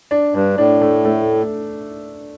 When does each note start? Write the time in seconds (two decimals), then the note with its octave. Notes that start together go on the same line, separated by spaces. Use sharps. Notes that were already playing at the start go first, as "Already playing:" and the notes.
0.11 D4
0.34 G2 D4
0.58 A2 D4
0.81 A3
1.05 A3